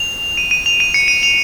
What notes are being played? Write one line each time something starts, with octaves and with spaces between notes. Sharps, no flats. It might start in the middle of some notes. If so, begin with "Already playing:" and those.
Already playing: F7
D#7
D#7
F7
D#7
C#7
D#7
F7